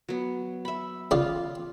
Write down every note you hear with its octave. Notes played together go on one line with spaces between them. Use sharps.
F#3 B3
E5 B5
C#3 F4 D5 F5